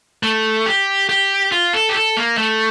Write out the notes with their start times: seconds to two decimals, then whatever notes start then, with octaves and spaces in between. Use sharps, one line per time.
0.23 A3
0.66 G4
1.09 G4
1.52 F4
1.73 A4
1.89 G4
1.95 A4
2.17 A#3
2.38 A3